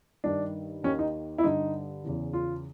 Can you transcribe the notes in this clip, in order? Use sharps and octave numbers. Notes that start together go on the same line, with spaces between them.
G2 D#3 D4
D#2 D#3 C#4
D#4
E4
G2 D3 D#4
E2 C#3 E3
F4